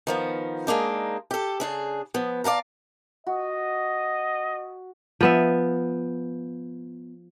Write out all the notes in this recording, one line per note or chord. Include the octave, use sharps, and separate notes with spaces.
D#3 F3 B3
G#3 A#3 D4 D#4
G4 A4
C#3 D4 G#4
F3 B3
D5 F5 A5 A#5
F#4 D#5
F3 B3 E5